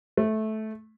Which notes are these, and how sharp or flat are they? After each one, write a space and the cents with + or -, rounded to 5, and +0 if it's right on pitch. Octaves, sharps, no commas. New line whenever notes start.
A3 -15